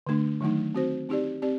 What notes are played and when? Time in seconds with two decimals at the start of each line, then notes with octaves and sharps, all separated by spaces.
0.07 D3 A3 D4
0.41 D#3 F#3 A3 D#4
0.75 C4 F#4 C5
1.09 C4 D#4 G4 D5
1.42 C4 G4 D5